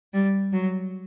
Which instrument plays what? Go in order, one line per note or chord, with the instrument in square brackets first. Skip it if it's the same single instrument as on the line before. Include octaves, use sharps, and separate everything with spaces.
[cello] G3
F#3